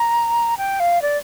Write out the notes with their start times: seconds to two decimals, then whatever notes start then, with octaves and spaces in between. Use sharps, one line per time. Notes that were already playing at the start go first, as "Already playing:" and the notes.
Already playing: A#5
0.58 G5
0.80 F5
1.02 D5